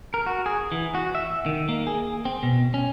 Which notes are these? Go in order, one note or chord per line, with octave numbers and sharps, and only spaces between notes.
A#4
F#4
G#4
E3
F#4
E5
D#3
A#3
G#4
C4
B2
C#4